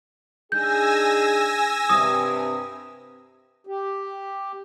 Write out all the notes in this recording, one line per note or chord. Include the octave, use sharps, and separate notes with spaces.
D4 D#4 G#4 G#5 E6 G6 A#6
G2 C3 D#6
G4